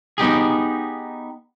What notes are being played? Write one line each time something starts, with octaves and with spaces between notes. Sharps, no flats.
B3 D#4 G4 G#4